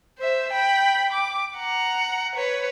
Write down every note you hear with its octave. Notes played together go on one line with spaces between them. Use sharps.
C5 E5
G5 B5
D6
F#5 A#5
B4 C#5